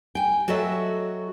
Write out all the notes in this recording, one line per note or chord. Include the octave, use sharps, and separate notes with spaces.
G5 G#5
F#3 F#4 A4 D#5 E5